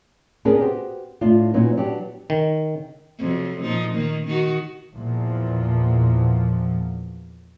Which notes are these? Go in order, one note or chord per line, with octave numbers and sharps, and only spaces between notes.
B3 C#4 D4 G#4 A#4 B4
F#4 G4 C5
A2 D4 F4
A#2 F#3 B3 C#4 D#4
F#3 B3 D4 G4
D#3
F2 C3 F#3
A#2 F3 D#4
D#3 A#3
D#3 D#4 F#4
E2 A#2 F3